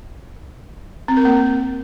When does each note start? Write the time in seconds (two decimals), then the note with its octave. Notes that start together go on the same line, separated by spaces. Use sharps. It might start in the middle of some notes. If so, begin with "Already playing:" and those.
1.08 C4
1.17 A#4
1.25 A#3